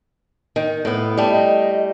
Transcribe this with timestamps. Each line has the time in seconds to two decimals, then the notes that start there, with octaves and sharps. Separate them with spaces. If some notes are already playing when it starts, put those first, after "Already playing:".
0.56 D#3
0.85 A2 B3
1.18 G3 A3
1.31 D#5